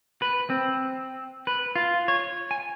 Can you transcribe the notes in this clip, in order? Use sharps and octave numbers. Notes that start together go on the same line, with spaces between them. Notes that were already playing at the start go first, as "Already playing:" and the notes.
B4
C4
B4
F4
C#5
G#5